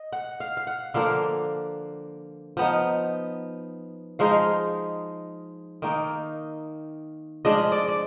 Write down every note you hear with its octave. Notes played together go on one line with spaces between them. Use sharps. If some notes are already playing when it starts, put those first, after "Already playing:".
Already playing: D#5
F#5
F5
F5
F#5
D3 F3 A#3 D4 F5
F3 B3 D#4
F3 G#3 D#4 F5
D#3 A#3 D#4
F3 G#3 D4 D#5
D5
D5